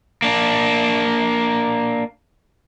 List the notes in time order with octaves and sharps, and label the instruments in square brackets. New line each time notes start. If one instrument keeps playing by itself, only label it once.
[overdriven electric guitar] A#3 D4